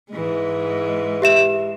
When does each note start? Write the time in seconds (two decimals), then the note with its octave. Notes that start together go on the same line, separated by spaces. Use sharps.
0.11 G#2 E3 G#3
1.22 G4 E5 E7